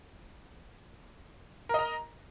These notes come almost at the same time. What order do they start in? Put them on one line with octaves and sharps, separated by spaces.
A#4 D#5 A#5